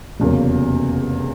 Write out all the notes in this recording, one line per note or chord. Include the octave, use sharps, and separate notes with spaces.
F1 E2 C#3 F#3 A#3